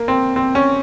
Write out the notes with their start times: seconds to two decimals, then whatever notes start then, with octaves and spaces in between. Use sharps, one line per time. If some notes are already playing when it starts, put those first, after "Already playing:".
Already playing: A#3
0.08 C4
0.36 C4
0.55 C#4